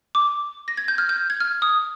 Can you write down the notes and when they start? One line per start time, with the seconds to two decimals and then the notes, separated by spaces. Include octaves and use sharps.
0.15 D6
0.68 A#6
0.77 G#6
0.88 G6
0.98 F6
1.09 G6
1.30 G#6
1.40 F6
1.62 D#6